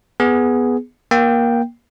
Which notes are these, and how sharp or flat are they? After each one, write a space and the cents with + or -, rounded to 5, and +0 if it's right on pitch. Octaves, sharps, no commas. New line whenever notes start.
B3 +0 G#4 +0
A#3 +20 G5 +0